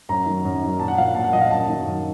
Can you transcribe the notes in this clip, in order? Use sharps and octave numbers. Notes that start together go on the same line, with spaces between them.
F#2 A#5
D#3 F#3
F#2
D#3 F#3
A#2 A5
F#5
F3 F5
F#5
A#2 A5
F#5
F3 D#5
F5
F#2 A5
D#3 F#3
F#2